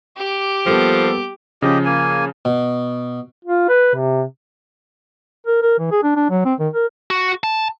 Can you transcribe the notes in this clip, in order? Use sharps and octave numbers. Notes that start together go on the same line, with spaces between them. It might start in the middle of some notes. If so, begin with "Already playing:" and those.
G4 D6
F3 G3 A#3 B3 A4
C#3 F3 C#4 G4 D#5
A#3 G#5
B2
F4
B4
C3
A#4
A#4
E3
G#4
D4
D4
F#3
C4
D#3
A#4
F#4
A5